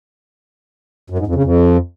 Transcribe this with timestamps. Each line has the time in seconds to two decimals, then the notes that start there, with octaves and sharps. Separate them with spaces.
1.10 F#2
1.18 G#2
1.27 F2
1.35 C#3
1.44 F2